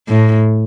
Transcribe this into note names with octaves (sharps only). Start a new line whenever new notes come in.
A2